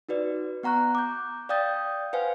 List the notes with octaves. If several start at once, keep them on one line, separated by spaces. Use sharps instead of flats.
D#4 F#4 B4 D5
B3 F#5 A#5 C#6 F#6
D6 G6
D5 F5 G5 D#6 G6 A6
B4 C5 F5 F#5 G#5